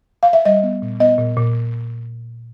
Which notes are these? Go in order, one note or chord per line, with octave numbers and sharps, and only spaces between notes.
F5
E5
G3 D#5
B3
A#2
B3 D#5
A#2
A#2